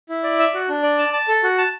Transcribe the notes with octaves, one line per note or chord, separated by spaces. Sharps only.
E4
D5
E5
F#4
D4
D5
A5
A5
A4
F#4
A5